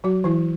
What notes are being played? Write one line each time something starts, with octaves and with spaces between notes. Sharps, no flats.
F#3 F#4
E3 E4